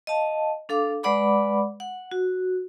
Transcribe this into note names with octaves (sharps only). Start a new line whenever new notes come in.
D#5 F5 A5
D4 A4 F5 D6
G#3 B4 D5 F#5 B5 D6
F#5
F#4